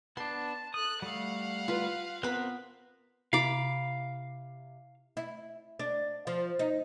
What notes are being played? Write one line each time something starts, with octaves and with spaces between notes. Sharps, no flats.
B3 D4 A5 C6
A4 D#6 F#6
G3 A3 F5 F#5
F4 B4
B3 C4 A#4 B5 F#6
C3 E4 F5 B5 D6
E4
D4
F3
D#4